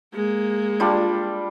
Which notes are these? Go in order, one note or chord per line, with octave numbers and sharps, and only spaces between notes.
G#3 A#3
G3 D4 F4